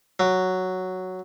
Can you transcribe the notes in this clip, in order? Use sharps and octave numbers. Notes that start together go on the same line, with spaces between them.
F#3